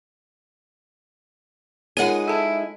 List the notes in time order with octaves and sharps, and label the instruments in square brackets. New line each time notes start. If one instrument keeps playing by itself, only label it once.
[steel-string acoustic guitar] G#3 D#4 G#4 [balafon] F4 A#4 C#5 [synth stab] F#5 D#7
[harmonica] E4 [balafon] A4 A5